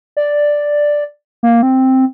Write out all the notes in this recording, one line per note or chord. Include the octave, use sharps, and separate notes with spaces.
D5
A#3
C4